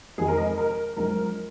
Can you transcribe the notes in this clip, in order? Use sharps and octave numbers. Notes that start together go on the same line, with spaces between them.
F2 D#3 G#3 G#4
A#4
D#5
A#4
F#2 F3 G#3 A#4